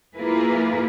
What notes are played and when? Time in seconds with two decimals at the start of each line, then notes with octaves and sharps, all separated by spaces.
0.15 A#3 E4 F4 G#4 A#4 B4